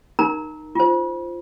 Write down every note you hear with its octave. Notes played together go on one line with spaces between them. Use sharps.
D#4 A#4 A#5
F4 C5